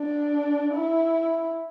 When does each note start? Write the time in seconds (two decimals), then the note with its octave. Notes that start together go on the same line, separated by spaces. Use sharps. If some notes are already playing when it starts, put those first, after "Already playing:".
Already playing: D4
0.74 E4